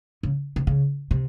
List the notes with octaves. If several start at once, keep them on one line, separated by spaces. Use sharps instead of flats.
C#3
C3
C#3
C3